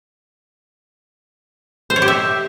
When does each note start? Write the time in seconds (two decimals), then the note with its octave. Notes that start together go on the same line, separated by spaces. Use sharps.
1.90 C5
1.96 C#5
2.02 G4
2.08 E5